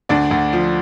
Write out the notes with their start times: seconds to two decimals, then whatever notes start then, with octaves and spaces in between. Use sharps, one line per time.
0.09 D2 D4 D5
0.31 D2
0.53 F3